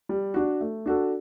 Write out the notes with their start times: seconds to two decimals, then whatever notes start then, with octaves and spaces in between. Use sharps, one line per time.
0.09 G3
0.34 D4 F#4
0.61 A3
0.86 D4 F#4 A4